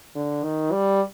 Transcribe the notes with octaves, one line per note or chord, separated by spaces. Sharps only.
D3
D#3
G3